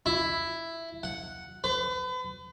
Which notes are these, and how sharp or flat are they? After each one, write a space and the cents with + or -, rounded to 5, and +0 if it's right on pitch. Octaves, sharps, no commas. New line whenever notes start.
E4 +5
F#5 +0
B4 +40